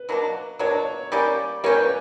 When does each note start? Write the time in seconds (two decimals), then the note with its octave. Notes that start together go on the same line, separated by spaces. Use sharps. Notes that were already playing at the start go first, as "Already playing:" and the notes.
Already playing: B4
0.09 B2 F#3 A#3 D4
0.59 B2 F#3 A#3 D4 C#5
1.12 G3 A#3 C#4 G4 D5
1.64 G3 A#3 C#4 G4 C#5
1.75 B4